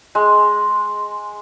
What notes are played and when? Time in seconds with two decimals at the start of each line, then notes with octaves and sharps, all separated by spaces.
0.15 G#3